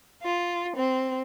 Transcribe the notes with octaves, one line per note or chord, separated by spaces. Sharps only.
F4
C4